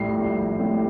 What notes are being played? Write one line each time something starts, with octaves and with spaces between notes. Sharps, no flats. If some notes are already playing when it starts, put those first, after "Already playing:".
Already playing: A#1 A2 G3 C7
A#1
A2 G3